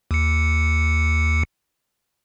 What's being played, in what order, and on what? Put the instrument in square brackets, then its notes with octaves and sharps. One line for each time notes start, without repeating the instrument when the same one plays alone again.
[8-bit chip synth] D#2 C#7